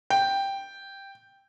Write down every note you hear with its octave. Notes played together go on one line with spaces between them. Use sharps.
G5